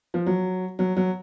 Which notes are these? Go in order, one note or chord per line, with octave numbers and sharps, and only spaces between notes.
F3
F#3
F#3
F#3